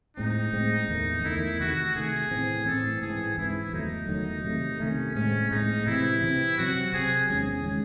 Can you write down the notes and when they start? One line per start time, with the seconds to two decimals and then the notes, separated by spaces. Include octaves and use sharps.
0.17 A2 G#3 C4 D#4
0.53 A2 G#3 C4
0.89 E2 D#3 A3
1.24 E2 D#3 A3 E4
1.59 C3 D#3 A3 F#4
1.95 C3 D#3 A3 G#4
2.31 A2 E3 C4
2.66 A2 E3 C4 A4
3.01 G#2 E3 C4 G#4
3.38 G#2 E3 C4 E4
3.73 E2 D#3 F#3 A3 D#4
4.08 E2 D#3 F#3 A3
4.45 C3 D#3 A3
4.80 C3 D#3 A3 C#4
5.15 A2 G#3 C4 C#4
5.51 A2 G#3 C4 D#4
5.86 C3 E3 C4 E4
6.23 C3 E3 C4
6.58 C3 F#3 C4 F#4
6.94 C3 F#3 C4 G#4
7.29 E2 D#3 G#3 C#4 G#4
7.64 D#3 G#3 C#4